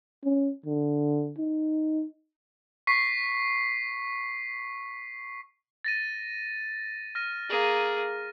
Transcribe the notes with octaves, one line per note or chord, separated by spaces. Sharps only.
C#4
D3
D#4
C#6 B6 C7
A6 A#6 D#7
F6 A#6 D#7
A#3 G#4